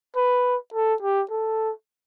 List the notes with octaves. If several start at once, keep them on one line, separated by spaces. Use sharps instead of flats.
B4
A4
G4
A4